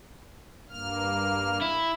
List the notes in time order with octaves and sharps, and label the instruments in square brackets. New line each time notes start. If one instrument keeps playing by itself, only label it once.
[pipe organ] G2 A#3 F6
[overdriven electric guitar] E4